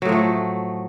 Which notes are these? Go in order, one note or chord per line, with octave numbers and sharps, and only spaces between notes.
A2 F3 F#3 A3